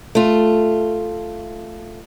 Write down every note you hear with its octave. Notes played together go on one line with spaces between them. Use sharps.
A3 F4